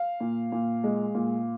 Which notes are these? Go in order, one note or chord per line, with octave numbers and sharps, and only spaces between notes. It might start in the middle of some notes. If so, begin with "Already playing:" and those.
Already playing: F5
A#2
A#2
G#3
A#2